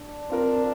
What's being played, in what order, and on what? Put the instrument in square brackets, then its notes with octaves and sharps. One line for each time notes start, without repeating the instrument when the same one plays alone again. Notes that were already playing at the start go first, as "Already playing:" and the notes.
Already playing: [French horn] D4
[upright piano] C4 F4 A#4